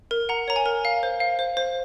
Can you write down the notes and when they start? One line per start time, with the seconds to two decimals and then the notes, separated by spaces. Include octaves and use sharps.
0.11 A#4
0.29 F#5 A#5
0.48 C#5 A#5
0.56 G#5
0.66 A#4
0.85 F5
1.03 C5
1.20 F5
1.39 C5
1.57 C5